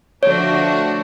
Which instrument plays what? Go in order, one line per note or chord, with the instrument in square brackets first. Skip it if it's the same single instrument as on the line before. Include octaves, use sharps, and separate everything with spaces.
[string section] D3 F3 A3 D4 F#4 [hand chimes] C#5